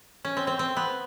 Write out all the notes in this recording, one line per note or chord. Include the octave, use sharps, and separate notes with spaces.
C#4
C4
C4
C4
B3